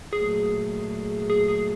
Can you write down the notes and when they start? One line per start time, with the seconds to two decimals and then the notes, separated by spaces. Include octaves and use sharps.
0.12 A#2 F#3 A3 G#4
1.30 G#4
1.48 G#4